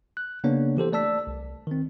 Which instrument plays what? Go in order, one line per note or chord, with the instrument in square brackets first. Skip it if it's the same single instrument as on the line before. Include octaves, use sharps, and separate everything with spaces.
[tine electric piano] F#6
C#3 A#3 B3 D4 C#5
E3 G4 A4 C5
A3 D5 A5 E6 B6
C2
D#3 C4